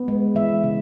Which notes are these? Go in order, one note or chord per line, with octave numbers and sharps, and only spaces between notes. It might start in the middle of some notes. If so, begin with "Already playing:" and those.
Already playing: B3
G#3
E3 E5
C#3